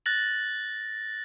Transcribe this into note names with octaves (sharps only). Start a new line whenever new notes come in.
F#6 A6 A#6 F#7